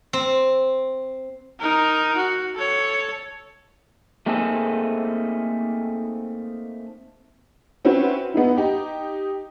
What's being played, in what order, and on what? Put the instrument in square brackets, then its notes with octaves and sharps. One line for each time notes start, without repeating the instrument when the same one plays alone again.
[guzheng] C4
[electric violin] D#4 A#4
F#4
A4 C#5
[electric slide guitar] A3 A#3 C4 D#4 G#4 A4
[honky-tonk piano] C4 C#4 E4 F#4 B4
B3 D#4 E4
D#4 G4